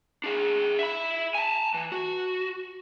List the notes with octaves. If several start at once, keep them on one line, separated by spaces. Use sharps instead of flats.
D4 G#4
E5 B5
G#5 A5
E3
F#4